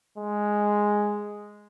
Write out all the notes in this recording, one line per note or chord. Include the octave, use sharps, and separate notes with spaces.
G#3